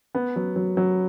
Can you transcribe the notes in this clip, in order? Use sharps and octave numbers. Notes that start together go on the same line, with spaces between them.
B3
F#3
F#3
F#3